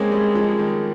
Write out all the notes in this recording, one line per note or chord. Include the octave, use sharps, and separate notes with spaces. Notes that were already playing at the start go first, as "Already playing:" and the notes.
Already playing: G#3 A#3 C4 C#4
G3
F3
D#3